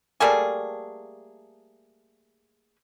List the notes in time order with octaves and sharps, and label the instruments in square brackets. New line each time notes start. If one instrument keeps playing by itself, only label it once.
[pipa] G3 A3 A#3 G#4